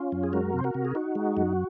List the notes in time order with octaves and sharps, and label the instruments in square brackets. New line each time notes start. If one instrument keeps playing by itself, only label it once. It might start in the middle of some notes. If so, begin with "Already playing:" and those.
Already playing: [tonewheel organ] C#4 F4
F#2
G#4
G#3 F#4 A#4
C3 C5
F#4 A#4
C3
G#4
D#4 F#4
G#3
F#2